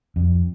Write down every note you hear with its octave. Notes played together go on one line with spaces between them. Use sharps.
F2